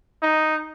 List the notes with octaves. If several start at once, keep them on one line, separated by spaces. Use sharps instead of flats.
D#4